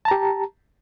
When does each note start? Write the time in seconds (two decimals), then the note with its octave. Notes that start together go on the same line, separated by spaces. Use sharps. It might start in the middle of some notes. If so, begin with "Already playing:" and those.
0.05 A5
0.08 A#5
0.11 G4